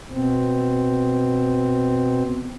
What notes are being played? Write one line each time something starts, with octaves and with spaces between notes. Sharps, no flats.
B2 C4